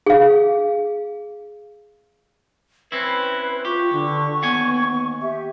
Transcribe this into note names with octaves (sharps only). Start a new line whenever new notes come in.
G#4 F5
C4 C#4 E4 B4
F4 G4 C#6
D3
D#2 B3 F#5 G#5
G4 E5